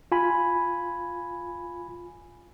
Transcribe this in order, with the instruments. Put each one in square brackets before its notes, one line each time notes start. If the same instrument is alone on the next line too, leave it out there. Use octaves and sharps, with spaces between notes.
[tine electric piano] F4 G#5 B5